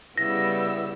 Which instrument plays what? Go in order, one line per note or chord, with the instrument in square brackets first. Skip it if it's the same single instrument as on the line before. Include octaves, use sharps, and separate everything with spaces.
[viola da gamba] C#3 G3 [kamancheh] B3 E6 [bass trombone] E4 [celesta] A#6